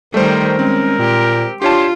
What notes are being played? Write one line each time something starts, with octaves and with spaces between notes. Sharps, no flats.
D#3 G3 A3 A#4 C5
G#3 C4 C#4
A#2 G4
D4 F4 G4 C#5 A5 C6